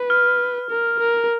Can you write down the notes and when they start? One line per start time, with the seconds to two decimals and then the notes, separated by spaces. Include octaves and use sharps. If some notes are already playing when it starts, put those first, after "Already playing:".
Already playing: B4
0.10 F6
0.70 A#4
1.00 A#4